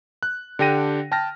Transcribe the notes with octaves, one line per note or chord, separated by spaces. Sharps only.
F#6
D3 D4 G4 G5 A#6 D#7
G5 A5 F6 A#6